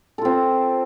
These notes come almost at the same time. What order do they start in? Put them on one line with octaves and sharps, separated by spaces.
A4 F4 C4